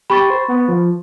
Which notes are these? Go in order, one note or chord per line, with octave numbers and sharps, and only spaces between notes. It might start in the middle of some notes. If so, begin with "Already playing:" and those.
G4 B5 C#6 A6
C5
B3
F3